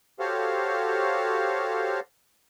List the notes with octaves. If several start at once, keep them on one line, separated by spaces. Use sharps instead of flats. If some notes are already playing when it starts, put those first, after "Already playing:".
F#4 G4 A4 C5 C#5 F5